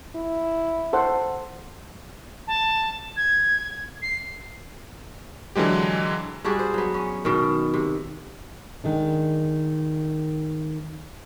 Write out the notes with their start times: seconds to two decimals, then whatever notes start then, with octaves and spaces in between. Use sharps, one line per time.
0.15 E4
0.93 A4 C5 F#5
2.47 A5
3.17 G#6
4.02 C7
5.56 D3 E3 F#3 G#3 G4
6.44 G3 D4 F#4 G#4
6.59 C5
6.74 F#3 B3
6.94 C#4
7.25 B2 D#3
7.74 C3
8.84 D#3 G#3 D4